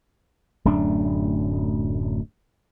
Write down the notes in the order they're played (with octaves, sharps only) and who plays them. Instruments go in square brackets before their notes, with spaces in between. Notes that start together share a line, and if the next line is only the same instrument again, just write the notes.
[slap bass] D1 F#2 A3 D4